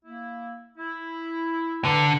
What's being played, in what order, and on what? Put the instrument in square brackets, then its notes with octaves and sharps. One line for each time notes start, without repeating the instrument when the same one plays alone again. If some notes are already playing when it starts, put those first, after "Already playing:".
[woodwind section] A#3 E4
E4
[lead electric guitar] D3 [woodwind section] B4 A#5